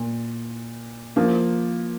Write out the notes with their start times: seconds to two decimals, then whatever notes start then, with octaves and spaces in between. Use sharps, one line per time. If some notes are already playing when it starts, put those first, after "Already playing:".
Already playing: A#2
1.16 F3 A#3